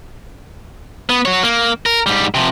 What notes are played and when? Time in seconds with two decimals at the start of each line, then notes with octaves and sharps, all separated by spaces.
1.10 B3
1.25 F#4 C#5
1.43 A#3
1.86 A#4
2.06 G#2 G3
2.35 C3 F3